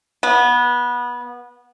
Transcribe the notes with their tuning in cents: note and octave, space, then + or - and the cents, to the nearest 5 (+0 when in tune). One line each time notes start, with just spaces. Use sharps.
B3 -20